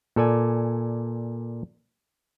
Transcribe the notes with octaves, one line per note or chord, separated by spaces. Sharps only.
A#2 A4 D5 G#5